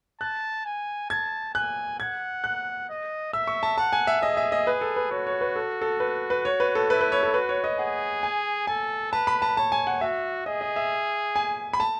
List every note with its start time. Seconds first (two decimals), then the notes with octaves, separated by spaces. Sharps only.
0.21 A5 F#6
0.65 G#5
1.10 A5 G#6
1.54 G#5 F#6
1.99 F#5 G#6
2.44 F#6
2.89 D#5
3.33 E5 E6
3.47 C#6
3.63 A5
3.78 F#5 A5
3.93 G#5
4.07 E5
4.22 G#4 D#5
4.37 E5
4.52 D#5
4.67 B4
4.81 A4
4.96 B4
5.11 F#4 C#5
5.27 C#5
5.41 B4
5.56 A4
5.82 A4
6.00 B4
6.30 B4
6.45 C#5
6.60 B4
6.75 A4
6.90 E4 B4
7.01 B4
7.12 C#5
7.23 A4
7.34 F#4 B4
7.49 C#5
7.64 D#5
7.79 G#4 F#5
8.23 G#5
8.67 A4 G#5
9.12 B4 A5
9.27 B5
9.42 A5
9.57 C#5 A5
9.72 G#5
9.87 F#5
10.01 F#4 E5
10.46 G#4 D#5
10.61 D#5
10.76 E5
11.36 G#5
11.73 B5
11.80 A5